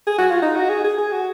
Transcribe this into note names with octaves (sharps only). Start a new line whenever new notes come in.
G#4
F#4
F4
D#4
F#4
G#4
G#4
G#4
F#4